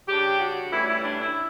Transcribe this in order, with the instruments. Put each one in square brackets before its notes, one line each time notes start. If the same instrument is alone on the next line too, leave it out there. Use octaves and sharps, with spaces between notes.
[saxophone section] C#3 G3 D4 G4
F#4
A2 E3 G3 C#4 E4
E4
D4
E4